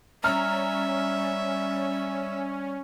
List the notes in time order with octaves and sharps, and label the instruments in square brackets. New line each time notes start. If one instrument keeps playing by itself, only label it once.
[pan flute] G3 [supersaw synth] C#4 [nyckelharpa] E5 [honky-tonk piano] A#5 F6